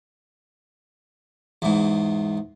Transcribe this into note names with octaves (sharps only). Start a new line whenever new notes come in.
E2 G#2